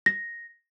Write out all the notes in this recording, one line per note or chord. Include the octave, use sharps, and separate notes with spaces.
A#6